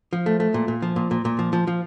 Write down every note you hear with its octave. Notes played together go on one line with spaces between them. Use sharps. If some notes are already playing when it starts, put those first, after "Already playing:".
F3
A3
A3
A#2
A#2
F3
A#2
A#2
A#2
F3
F3
F3